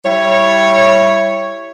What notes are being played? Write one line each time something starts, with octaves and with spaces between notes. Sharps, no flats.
G3 E4 C#5